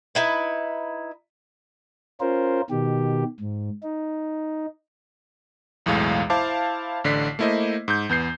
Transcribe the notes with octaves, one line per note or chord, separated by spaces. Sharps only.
D#4 E4 B4
C#4 F4 A#4 C5
B2 D#3 G4
G#2
D#4
B1 E2 A2 G#3 F5
E4 C5 F5 A5 D6
A1 D3 D5 B6 C7
A3 A#3 E4 C5 D#5
G#2 G6
E2 B3 G6 C7